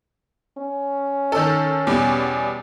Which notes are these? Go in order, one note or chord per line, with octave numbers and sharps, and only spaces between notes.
C#4
D#3 A4
E2 B2 G3